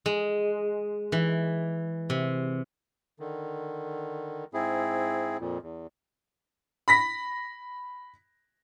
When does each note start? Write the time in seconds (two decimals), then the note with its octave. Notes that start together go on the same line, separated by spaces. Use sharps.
0.06 G#3
1.12 E3
2.10 C3
3.20 D3 D#3
4.54 G#2 C4 E4 G#4
5.40 F2 A#2
5.62 E2
6.88 B5 A#6 B6